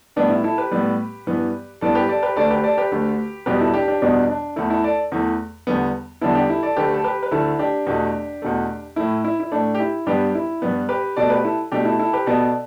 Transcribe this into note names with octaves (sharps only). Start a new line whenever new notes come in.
A2 G3 B3 D4
E4
E4 A4
G4 B4
A2 G3 B3
G2 E3 B3
G2 E3 B3 A4 D5
G4 B4
A4 D5
G4 B4
D2 D3 A3 A4 D5
G4 B4
A4 D5
G4 B4
D2 D3 A3
E2 B2 G3 B3 G4 B4
E4 A4
D4 G4
D4 G4
E2 B2 G3 B3 D4
D4
E2 E3 A3 E4
E4 A4
A4 D5
E2 E3 A3
E2 D3 G3 B3
E2 D3 G3 B3 E4 A4
D4 G4
E4 A4
A4 D5
D2 D3 A3 G4 B4
A4
G4 B4
B4
D2 D3 A3 E4 A4
D4 G4
E2 B2 A3
E2 B2 A3
A2 A3 E4
E4
E4
A2 A3 D4
G4
E4
G2 G3 B3 D4 G4
E4
G2 G3 B3
G4 B4
B2 A3 A4 D5
G4 B4
E4 A4
B2 A3 D4 G4
E4 A4
E4 A4
G4 B4
B2 B3 A4 D5